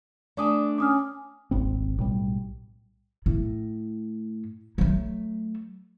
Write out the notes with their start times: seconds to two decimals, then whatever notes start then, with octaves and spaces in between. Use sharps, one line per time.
0.37 A3 D4 D5 G#5 D6 D#6
0.78 C#4 D6 D#6 F6
1.51 D#1 G#1 C4
1.98 B1 A2 G3
3.26 A2
4.78 F#3 A3